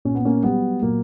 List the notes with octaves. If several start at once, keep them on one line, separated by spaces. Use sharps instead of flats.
A#2 C#4
B3
A#3 C#4
F#3 G3 B3
A#2 F#3 A#3